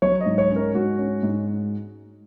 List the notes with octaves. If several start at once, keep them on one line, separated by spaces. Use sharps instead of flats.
F#3 C#5
D#5
G#2
C#5
C#4
A#4
G#2 F#4
C#4
G#2